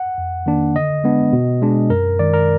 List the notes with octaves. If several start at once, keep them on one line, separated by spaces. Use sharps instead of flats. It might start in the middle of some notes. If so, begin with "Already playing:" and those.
Already playing: F#5
F2
D#3 A#3 D4
D3 D#5
G#3 B3 D4
B2
G#3 D4
F#2 A#4
D#3 G#3 D5
A#4